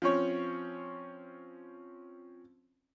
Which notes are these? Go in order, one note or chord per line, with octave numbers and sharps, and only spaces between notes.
F3 C4 C#4 C#5